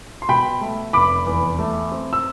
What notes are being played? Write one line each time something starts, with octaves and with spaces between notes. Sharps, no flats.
C6
B2 G5 B5
A3
F1 B5 D6
E2
A3
C4
E6